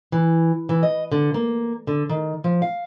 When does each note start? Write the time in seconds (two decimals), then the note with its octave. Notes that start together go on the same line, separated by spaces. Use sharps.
0.12 E3
0.69 E3
0.83 D#5
1.12 D3
1.34 A#3
1.87 D3
2.09 D#3
2.44 F3
2.62 F5